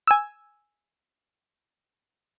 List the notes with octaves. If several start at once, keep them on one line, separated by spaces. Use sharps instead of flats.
G#5 E6